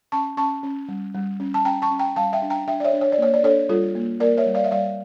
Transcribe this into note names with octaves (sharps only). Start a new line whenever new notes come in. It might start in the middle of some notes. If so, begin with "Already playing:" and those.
C#4 A5 C#6
C#4 A5 C#6
C#4
G3
G3
C#4
A5
C#4 G5 A#5
A5 C#6
C#4
G5 A#5
G3 F5 A5
E5 G5
D4
G5 A#5
D4 E5 G5
D5
C#5 E5
D4
C#5
D5
A#3 C#5
D5
D4 A4 C#5
G3 F4 A4
A#3
A#3 A#4 D5
C#5 E5
G3
D5 F5
E5
G3 D5 F5